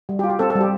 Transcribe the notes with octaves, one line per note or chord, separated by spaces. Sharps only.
G3
G4
F4
G4
C4 A4
A4
G3
G4